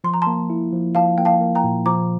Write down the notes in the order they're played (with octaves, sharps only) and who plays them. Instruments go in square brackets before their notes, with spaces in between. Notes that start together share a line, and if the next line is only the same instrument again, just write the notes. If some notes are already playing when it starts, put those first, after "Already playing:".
[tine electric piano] F3 [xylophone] C6
[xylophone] A#5
[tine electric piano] A#3 [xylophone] A5 C6
[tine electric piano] E4
F3
[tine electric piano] F3 [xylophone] F5 A5
[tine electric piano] A#3 [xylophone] G5
[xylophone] F5 A5
[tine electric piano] A#3
[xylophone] G5 A#5
[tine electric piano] A#2
[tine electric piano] F3 [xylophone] A#5 D6